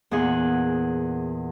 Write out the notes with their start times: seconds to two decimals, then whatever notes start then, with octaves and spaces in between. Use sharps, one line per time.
0.11 E2 A#2 G#4 F#5